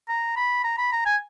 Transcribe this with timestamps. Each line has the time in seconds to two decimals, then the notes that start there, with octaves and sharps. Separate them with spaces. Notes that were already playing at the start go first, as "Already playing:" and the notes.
0.09 A#5
0.36 B5
0.64 A#5
0.78 B5
0.92 A#5
1.06 G#5